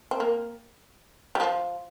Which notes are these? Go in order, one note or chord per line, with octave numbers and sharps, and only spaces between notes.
C4
A#3
G3
F3